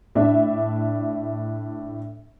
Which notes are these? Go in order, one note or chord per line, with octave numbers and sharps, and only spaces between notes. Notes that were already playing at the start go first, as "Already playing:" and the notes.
A2 D4 E5